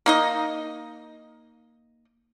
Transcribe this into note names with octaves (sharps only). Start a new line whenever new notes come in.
A#3 D#4 D#5